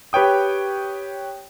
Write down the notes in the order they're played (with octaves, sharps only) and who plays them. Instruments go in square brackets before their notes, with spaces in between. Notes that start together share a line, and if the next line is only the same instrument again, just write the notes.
[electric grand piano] G4 B4 C#5 G5 D#6